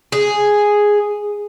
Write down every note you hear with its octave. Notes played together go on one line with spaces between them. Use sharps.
G#4